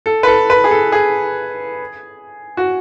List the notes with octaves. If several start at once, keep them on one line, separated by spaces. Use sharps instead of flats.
A4
B4
A4
B4
G#4
A4
G#4
F#4